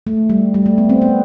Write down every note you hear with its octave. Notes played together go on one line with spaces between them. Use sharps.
A3
G3
G3
A3
B3
C4
B3